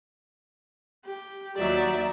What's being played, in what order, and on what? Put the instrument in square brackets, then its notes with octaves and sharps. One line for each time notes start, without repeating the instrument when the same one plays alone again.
[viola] G4
[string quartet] D#2 D#4 E5 [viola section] F#3 [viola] D5